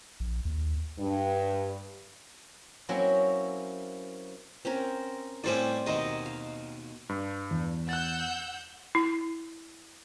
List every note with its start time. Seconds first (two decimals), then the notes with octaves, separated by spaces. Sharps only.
0.20 A#1
0.45 D#2
0.99 G2
2.89 F#3 A#3 C4 C#4 E4 F#4
4.65 C4 C#4 A#4
5.44 A2 G3 C4 C#4 C5 D5
5.86 D#2 B2 D#5 A#5 C6
6.26 F5
7.09 G2
7.51 E2
7.89 F#5 E6 F#6 G6 A6
8.95 E4